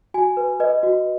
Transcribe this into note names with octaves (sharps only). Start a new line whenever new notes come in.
F#4 G#5
B4
B4 D#5
F#4